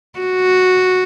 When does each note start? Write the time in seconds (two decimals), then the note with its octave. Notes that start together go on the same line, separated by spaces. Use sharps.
0.19 F#4